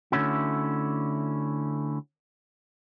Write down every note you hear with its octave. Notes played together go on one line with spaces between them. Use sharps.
D3 A3 C#4 E4 F#4